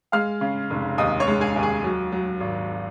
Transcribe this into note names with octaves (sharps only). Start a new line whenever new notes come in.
G#3 F5 F6
C#3
F1
D#2 D#5 D#6
C#5 C#6
G#3
G#4 G#5
D#2
G#4 G#5
F#3
F#3
G#1